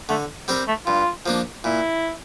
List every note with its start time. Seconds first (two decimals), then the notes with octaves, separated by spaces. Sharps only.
0.09 D3 A3
0.48 G3 C4 G4 A#4
0.68 A3
0.86 G2 F4
1.26 F3 A#3 D4
1.64 A#2 E4